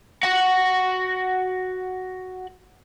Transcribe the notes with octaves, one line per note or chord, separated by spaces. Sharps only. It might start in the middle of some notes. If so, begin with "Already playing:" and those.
F#4 F#5